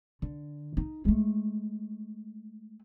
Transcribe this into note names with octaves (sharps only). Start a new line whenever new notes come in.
D3
D#4
G#3 A3